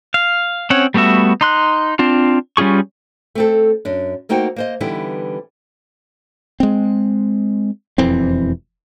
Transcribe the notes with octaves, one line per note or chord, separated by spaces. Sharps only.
F5
C4 C#4 C#5 F#5
G3 A3 B3 F#4 E5
D#4 C6 F#6
C4 D4 F4
G3 C#4 F4 G#4 C#6
A3 C4 A4
F#2 D4
A3 A#3 D#4 F#4 C5 G5
A#3 C5 D#5
D3 E3 G3 B3 D#4 E4
G#3 C4
E1 F2 E3 C4